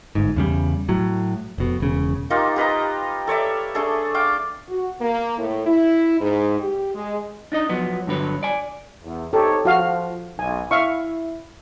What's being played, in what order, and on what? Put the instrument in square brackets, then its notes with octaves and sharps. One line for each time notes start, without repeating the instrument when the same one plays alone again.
[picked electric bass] G1 G#2
E2 C#3 G3
A2 F#3
F1 B2
E1 C#3
[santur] A#3 D#4 F4 G4
G4 B4 D#5 A#5
A4 C#5 D5 E5
A3 D4 G#4 A4
F5 G5 D6
[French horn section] F#4
A#3
A2
E4
G#2
G4
G#3
[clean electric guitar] D4 D#4 D#5
F3 F#3 B3
G2 D3 F#3 B4 C#5
D5 G#5
[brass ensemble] E2
[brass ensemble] C4 D#4 C#5 [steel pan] G4 A4
[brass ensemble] F3 [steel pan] F#4 F5
[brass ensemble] B1 [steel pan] G#5
[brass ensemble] E4 [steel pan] E5 F5 C#6